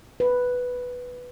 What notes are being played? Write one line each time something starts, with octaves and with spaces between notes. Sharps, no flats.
B4